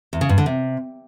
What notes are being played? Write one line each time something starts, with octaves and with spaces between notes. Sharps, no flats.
E2
C#3
G2
D3
C3